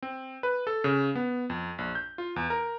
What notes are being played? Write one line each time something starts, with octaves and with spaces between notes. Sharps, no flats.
C4
B4
A4
C#3
B3
F2
A#1
G6
F4
E2
A#4